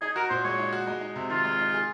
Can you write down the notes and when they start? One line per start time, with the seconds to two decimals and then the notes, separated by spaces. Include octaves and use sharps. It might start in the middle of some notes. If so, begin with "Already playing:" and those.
0.02 D#4 G#4
0.16 F#4 A#4
0.30 A#2 C5
0.44 G#3 C#5
0.59 D#4
0.73 F#4
0.87 G#3
1.01 D#4
1.16 C3
1.30 D#3 F4
1.45 G#3
1.59 D#4
1.74 G#4